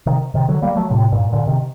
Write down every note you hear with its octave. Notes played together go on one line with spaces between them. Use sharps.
C3 D#3
C3 D#3
D3 F#3
G3 A#3
F#3 A3
A2 C3
G2 A#2
A#2 D3
C3 D#3